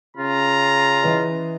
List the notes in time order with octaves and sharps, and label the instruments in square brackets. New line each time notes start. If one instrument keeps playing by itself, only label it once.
[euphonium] C#3 [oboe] F4 [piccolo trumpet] A#5
[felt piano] E3 B4 D#5